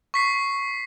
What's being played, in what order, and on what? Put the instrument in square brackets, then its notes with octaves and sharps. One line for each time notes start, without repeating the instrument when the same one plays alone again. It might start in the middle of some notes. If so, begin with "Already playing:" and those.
[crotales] C#6 B6 C7